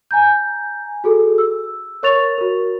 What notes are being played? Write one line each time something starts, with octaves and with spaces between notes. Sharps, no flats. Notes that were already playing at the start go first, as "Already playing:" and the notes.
G#5 A#5 G6
F#4 G#4 A4
E6
A#4 C#5 C#6 A6 F7
F#4 A#4